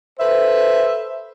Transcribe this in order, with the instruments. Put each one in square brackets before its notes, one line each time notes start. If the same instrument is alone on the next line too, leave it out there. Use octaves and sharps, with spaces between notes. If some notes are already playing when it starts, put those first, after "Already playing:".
[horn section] A4 B4 C5 [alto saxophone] E5